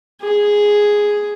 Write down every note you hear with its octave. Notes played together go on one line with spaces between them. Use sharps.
G#4